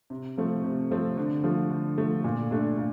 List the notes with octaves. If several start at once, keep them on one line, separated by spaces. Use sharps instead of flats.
C3
F3 A3 C4
C3
F3 A3 C4
D3
F3 A3
D3
F3 A3
A#2
A3 D4
A#2